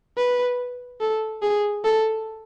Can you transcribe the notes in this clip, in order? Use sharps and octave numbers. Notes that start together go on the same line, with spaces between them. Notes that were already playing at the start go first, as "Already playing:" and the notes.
B4
A4
G#4
A4